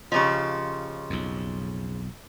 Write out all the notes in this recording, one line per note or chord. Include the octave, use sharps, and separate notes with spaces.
C#3 F3 D#4 G4 C#6
B1 F2